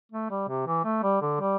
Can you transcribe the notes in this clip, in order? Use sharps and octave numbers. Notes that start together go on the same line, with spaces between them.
A3
G3
C3
E3
A3
G3
D3
G3